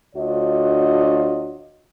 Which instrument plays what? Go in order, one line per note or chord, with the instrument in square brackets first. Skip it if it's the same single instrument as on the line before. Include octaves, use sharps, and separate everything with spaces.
[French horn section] D2 D4 F4 F#4 C#5 D#5